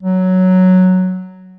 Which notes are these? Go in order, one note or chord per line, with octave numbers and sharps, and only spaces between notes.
F#3